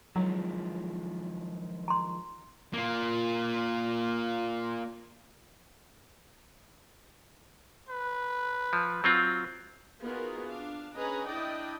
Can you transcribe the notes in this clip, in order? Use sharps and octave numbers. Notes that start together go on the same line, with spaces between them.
D#3 F3 F#3 G#3
A#5 C6
A#3 F4
B4
F3
F#3 C4 F4
B3 D#4 F4 F#4 G#4 A#4
D4 F5
C#4 G#4 B4 D#5 A#5
D4 E4 D5 D#5 G5